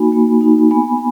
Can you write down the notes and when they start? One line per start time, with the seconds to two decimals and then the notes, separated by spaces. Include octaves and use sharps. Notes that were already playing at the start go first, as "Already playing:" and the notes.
Already playing: A#3 D#4 F#4 G#5 B5
0.12 A#3
0.41 D#4 F#4
0.71 B3 G#5 B5